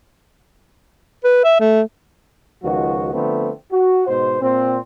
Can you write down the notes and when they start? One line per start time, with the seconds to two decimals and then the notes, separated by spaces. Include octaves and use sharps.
1.24 B4
1.44 E5
1.60 A3
2.63 C#2 D#3 F3 F#4
3.13 D3 F3 A3 B3 C4
3.72 F#4
4.07 G#2 B2 C5
4.41 A#2 C4